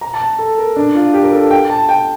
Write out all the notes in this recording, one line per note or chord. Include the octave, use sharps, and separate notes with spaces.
A#5
A5
A4
A#4
D4
F4
G4
A#4
A4
G5
A5
G5